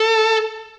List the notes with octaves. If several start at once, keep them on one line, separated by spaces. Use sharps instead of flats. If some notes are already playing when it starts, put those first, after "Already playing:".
Already playing: A4